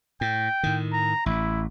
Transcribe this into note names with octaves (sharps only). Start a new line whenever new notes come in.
A2 G5
A2 D#3
A#5
A1 E4